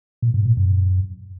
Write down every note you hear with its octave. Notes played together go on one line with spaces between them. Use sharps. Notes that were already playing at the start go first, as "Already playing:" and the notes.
A#2
G#2
A#2
F#2